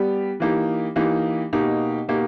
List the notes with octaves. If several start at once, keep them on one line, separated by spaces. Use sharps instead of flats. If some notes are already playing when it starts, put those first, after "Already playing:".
Already playing: G3 B3 G4
E3 A#3 D#4 G4
E3 A#3 D#4 G4
B2 A#3 D#4 G4
B2 A#3 D#4 G4